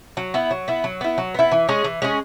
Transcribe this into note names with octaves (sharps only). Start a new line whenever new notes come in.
F#3
B3 E4
F#3
B3 E4
F#3
B3 E4
F#3
B3 E4
E3
G#3 C#4 G#4
E3
G#3 C#4 G#4